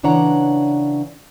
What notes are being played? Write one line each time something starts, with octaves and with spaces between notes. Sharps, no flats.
C#3 E3 D4 C#5 F#5 A#5